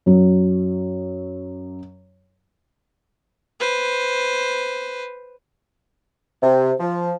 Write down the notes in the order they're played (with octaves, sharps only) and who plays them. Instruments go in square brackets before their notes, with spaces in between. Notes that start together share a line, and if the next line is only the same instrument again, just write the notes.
[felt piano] F#2 F#3
[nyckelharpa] B4 C5
[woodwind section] C3
F3